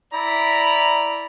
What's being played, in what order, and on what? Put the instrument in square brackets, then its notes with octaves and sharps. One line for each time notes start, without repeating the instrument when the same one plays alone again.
[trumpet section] E4 D5 A#5 B5